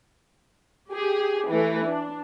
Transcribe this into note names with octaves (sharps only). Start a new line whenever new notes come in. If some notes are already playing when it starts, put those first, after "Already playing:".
G4 G#4
E3 A3
D4